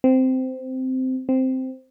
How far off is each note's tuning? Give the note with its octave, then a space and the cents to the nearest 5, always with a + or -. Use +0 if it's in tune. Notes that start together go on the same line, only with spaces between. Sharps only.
C4 -10
C4 -5